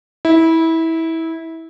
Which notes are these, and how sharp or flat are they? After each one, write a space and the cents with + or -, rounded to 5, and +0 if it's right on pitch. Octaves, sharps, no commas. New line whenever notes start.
E4 -20